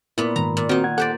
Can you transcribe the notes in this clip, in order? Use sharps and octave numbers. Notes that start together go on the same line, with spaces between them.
A#2 B3 E4
G#2 D#3 A#5
A#2
D#3 C4 D#4 F#4
F#5 G#6
G4 A4 C5 D5 F#5